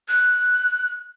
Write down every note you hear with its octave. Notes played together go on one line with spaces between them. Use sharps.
F#6